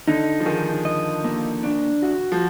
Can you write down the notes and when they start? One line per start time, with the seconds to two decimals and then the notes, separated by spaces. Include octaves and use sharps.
0.08 D3 D#4
0.40 F3
0.46 D#3 G#4
0.85 D#5
1.24 A#3
1.63 D4
2.02 F#4
2.32 F3